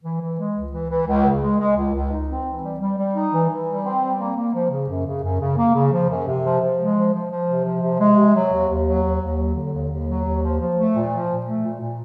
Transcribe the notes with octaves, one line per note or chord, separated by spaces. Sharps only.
E3
E3
G#3
C#2
E3
E3
C#2
C#3
G#3
G#3
C#2
C#2
D#4
C4
E3
G3
G3
G3
D#4
E3
E3
G3
C4
G3
A#3
A#3
F3
C#3
F#2
C#3
F#2
C#3
A#3
C#3
F3
F#2
C3
F3
F3
G#3
F3
F3
F3
C3
F3
C3
G#3
C3
F#3
D#2
D#2
F#3
D#2
D#2
F#3
D3
D#2
D#2
F#3
D#2
F3
F3
A3
A#2
F3
A#2
A3
A#2
A#2